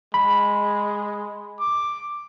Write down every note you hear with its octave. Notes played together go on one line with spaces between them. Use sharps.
G#3 B5
D6